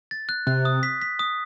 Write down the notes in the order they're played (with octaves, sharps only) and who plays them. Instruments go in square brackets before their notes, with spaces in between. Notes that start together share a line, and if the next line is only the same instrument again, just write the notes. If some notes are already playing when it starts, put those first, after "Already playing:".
[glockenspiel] A6
F#6
[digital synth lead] C3 [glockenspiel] F#6
[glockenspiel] D#6
B6
B6
D#6